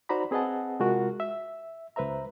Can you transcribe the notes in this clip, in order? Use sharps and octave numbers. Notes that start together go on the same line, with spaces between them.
D#4 F#4 C5 D5 A#5 B5
C4 G#4 B4 D#5 F#5 A5
C3 G#3 F4 F#4 A#4
E5
C#2 B4 C5 E5 A#5